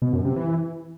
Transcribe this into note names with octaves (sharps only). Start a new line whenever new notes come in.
B2
F#2
C3
E3